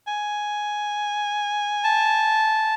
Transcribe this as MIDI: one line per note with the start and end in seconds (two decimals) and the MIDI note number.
0.07 2.74 80
1.84 2.75 81